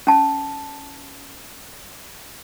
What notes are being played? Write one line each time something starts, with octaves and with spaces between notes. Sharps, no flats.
C#4 A5